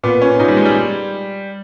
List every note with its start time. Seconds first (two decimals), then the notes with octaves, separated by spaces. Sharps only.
0.03 A#2 B3
0.21 C#4
0.39 A#2 D#4
0.48 G3
0.57 G#3
0.65 G3